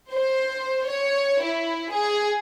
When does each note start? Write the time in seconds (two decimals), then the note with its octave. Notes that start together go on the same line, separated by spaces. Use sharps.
0.12 C5
0.89 C#5
1.44 E4
1.93 G#4